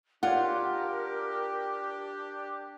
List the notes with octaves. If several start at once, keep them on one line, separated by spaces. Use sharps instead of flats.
D4 F4 G4 A#4 C#5 D5 F#5